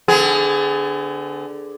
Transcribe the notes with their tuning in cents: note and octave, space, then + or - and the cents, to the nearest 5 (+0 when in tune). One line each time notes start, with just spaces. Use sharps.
D3 +0 B3 +45 G#4 +0